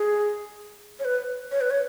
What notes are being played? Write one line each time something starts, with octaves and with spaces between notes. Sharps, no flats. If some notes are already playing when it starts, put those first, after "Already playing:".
Already playing: G#4
C#5
B4
C#5
B4
C#5